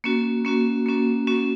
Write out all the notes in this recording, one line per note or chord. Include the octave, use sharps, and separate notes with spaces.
A#3 C#4 F#4
A#3 C#4 F#4
A#3 C#4 F#4
A#3 C#4 F#4